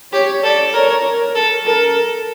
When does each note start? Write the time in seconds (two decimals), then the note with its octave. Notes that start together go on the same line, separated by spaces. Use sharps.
0.12 G4 C#5
0.43 A4 D5
0.73 A#4 C#5
1.05 A#4
1.35 A4
1.65 A4 A#4